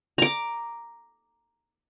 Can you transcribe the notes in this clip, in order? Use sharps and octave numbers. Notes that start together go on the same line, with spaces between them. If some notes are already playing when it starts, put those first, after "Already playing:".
A#5 D6